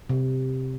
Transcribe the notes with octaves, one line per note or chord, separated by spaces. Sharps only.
C3